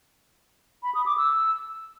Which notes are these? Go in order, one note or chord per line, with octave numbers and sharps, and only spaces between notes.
B5
D#6
D6
E6